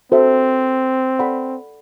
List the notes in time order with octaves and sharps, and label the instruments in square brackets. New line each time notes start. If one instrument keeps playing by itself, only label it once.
[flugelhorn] C4 [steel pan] F#4 A4 C5 E5
[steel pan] A4 D5 F#5 B5